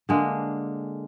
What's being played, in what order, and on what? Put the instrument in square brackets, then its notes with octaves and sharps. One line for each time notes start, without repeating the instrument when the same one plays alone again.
[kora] D3 G#3 A#3 D4